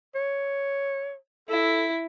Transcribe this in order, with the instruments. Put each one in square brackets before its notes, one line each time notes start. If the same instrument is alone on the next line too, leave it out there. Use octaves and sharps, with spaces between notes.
[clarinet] C#5
[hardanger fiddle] E4 [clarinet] A4